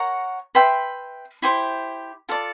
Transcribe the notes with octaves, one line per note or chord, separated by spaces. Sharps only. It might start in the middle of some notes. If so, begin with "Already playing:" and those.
Already playing: A#4 C#5 F#5 A#5
B4 E5 G5 C6
E4 G4 C5
F4 A4 D5